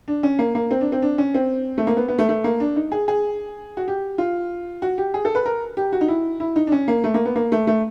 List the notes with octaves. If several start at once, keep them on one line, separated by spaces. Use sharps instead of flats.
D4
C#4
A#3
A#3
C4
D4
C4
D4
C#4
C4
A3
A#3
B3
B3
A3
A3
A#3
D4
D#4
G#4
G#4
F#4
G4
F4
F#4
G4
G#4
A4
B4
A#4
G4
F#4
D#4
E4
E4
D#4
D4
C#4
A#3
A3
A#3
B3
A#3
A3
A3